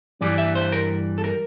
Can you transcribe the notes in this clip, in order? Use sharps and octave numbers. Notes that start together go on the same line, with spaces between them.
G2 E3 G3 D5
E5
C5
A#4
A4
A#4